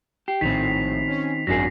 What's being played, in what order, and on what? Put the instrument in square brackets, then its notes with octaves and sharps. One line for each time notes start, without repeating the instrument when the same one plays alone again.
[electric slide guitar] G4 [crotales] C7
[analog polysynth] A#1 A2 [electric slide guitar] D#3 C4 [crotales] B6 F7
[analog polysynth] C#4
[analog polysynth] G#1 F#2 [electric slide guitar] F#3 D4 G#4 [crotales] A#6 C7